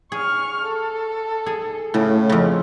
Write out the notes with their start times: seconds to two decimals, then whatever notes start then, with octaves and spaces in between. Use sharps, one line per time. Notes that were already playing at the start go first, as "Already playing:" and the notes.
0.12 G#4 C#6 F6
0.64 A4
1.46 G#4
1.94 A2 C#3
2.29 F2 C#3